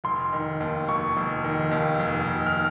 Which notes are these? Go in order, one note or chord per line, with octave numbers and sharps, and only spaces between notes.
F1 C6
D#3
D#2
F1 C#6
F1
D#3
D#2
F1
F1
F6